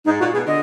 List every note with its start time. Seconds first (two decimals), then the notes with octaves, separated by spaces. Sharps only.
0.05 G#2 D#4
0.20 A#2 F#4
0.33 B2 G#4
0.46 D3 D#5